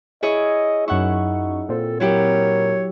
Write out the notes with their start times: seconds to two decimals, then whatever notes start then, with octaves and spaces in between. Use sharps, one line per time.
0.23 E4 G#4 C#5 D#5
0.88 F#2 D#4 E4 F#5 C#6
1.69 A#2 C4 A4
2.00 F#3 E4 G4 A#4 C#5